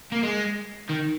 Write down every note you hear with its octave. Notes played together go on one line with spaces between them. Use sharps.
A#3
G#3
D#3